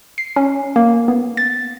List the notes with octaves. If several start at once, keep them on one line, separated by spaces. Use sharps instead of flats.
C7
C#4
A#3
B3
A6